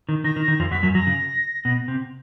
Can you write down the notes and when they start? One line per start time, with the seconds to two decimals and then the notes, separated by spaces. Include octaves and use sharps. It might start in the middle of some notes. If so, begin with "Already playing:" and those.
0.09 D#3
0.24 D#3 A#6
0.36 D#3
0.48 D#3
0.60 F2 F3
0.71 F#2 F#3 B6
0.83 F#2 F#3
0.94 F#2 F#3 A#6
1.07 C#3
1.65 B2
1.88 C3